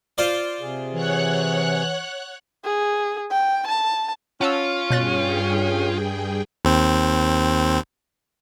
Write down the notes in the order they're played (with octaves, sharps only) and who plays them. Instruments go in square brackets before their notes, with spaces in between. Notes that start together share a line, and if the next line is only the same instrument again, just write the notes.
[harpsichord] F4 C5 D5
[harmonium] C3 G#4
[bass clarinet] E3 [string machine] C#5 F#5 F#6
[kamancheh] G#4
G5
A5
[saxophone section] C#4 [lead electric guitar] F4 [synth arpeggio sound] F#5 A5 E6
[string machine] G2 G#4 G5 [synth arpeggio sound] B2 F#6 A6
[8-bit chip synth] D#2 C4